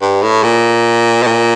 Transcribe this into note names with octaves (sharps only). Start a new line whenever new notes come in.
G2
A2
A#2
B2
A#2